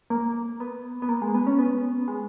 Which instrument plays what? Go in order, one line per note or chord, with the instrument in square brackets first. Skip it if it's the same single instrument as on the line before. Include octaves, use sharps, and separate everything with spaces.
[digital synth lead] A#3
B3
B3
A#3
G#3
B3
C#4
B3
G#3